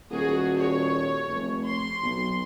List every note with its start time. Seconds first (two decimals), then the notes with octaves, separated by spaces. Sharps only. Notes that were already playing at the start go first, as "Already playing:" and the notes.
0.11 D#1 F#4 G#4
0.56 C#5
1.28 F1
1.65 C6
2.03 B1